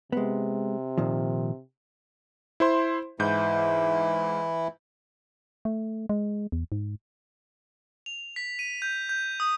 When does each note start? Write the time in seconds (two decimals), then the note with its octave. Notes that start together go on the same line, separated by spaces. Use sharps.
0.12 C3 G#3 B3
0.98 A#2 D#3 F3
2.60 E4 C5 C6
3.20 G#2 E3 E4 G6
5.65 A3
6.09 G#3
6.52 E2
6.72 G#2
8.06 F7
8.36 B6
8.59 D#7
8.82 G6
9.09 G6
9.40 D#6